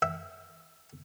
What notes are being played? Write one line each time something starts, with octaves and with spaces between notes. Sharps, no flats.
E5